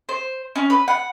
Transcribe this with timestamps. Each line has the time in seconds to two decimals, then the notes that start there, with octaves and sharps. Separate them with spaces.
0.09 C5
0.56 C#4
0.70 B4
0.88 F#5